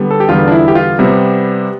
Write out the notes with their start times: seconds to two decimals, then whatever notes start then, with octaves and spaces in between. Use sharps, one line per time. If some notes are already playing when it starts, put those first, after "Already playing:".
Already playing: D3 G3 B3
0.11 A4
0.20 G4
0.29 E2 D3 G3 B3 F4
0.48 D4
0.52 E4
0.68 G4
0.75 F4
0.99 C3 G3 B3